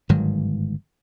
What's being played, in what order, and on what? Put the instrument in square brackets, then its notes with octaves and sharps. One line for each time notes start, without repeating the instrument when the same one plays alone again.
[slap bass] G1 G#2 D#3 F#3